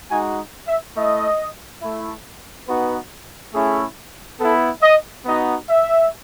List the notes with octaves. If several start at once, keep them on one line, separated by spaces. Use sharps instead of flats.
G#3 D#4 F#4 G#5
E5
A3 E4 D#5
A3 E4
B3 D#4 F#4 B4
A3 C#4 E4 G#4
B3 E4 A4
D#5
B3 D#4 F#4 D#5
E5